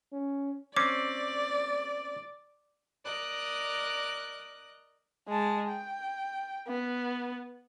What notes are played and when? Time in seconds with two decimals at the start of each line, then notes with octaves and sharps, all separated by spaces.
0.13 C#4
0.77 C4 C#4 D5 D6
3.04 A#4 D5 D#5 F#6
5.28 G#3 A5
5.69 G5
6.67 B3